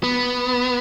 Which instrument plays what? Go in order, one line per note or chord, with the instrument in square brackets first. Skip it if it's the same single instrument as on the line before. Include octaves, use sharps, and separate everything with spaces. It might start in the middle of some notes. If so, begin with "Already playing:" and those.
[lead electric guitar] B3